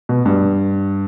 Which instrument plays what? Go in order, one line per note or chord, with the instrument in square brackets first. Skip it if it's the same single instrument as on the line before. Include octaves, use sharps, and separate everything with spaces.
[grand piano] B2
G2